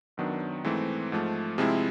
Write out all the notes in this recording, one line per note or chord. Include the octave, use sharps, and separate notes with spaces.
F#2 D#3 F#3 B3 D4
G#2 E3 A3 C4
G#2 F3 A3
C3 F3 G#3 C4 E4